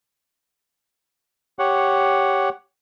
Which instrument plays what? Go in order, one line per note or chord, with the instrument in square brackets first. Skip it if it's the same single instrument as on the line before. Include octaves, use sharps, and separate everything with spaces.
[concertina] G4 C#5 F#5